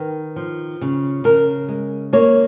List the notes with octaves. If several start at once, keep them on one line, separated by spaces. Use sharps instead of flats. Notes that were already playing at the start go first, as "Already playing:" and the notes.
Already playing: D#3 B4
F3
C#3
C#3 A#4
G#3
A#3 C#5